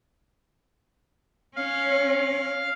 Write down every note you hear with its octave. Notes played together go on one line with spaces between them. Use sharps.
C#4 F5